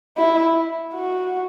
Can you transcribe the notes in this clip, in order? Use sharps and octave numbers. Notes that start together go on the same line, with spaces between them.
E4
F#4